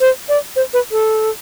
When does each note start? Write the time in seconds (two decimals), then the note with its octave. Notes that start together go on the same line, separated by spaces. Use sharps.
0.01 C5
0.29 D5
0.56 C5
0.74 B4
0.92 A4